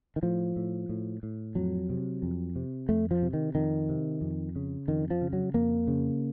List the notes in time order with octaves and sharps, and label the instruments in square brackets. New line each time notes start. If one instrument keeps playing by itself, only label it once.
[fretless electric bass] D#3
A2 F3
A2
A2
A2
F2 F#3
C3
F2
C3
F2 A3
F3
C3
D#3
F2 D#3
C3
F2
C#3
F2 D#3
F3
C#3
F#3
F2 A#3
C#3